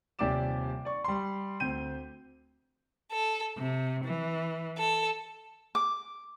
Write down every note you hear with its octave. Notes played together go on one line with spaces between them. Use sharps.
D#1 C3 G4 D5 D6 E7
D5 C#6
G3 C6
D2 C4 G6 D#7
A4
C3
E3
A4
D6